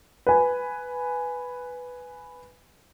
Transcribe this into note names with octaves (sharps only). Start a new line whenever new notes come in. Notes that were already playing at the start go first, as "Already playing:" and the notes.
B4 G#5